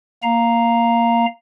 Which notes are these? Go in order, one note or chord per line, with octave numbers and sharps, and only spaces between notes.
A#3 F5 A#5